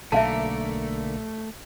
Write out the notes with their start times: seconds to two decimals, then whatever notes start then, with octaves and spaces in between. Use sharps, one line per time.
0.12 B1 D3 A3 A#3 A#4 E5 F5 A5